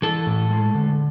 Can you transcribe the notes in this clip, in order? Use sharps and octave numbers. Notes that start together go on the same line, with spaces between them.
E3 A4
A2
G#3
D3